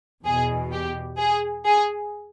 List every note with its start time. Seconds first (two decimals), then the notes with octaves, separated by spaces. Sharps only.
0.24 E2 B2 G#4
0.72 G4
1.18 G#4
1.65 G#4